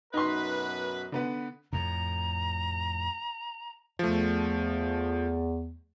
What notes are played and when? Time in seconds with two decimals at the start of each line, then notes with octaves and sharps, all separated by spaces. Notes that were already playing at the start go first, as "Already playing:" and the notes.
0.14 F#2 B2 D#4 B4 C6
1.12 D3 B3 B4
1.73 F2 A2 A#5
3.99 E2 F3 A3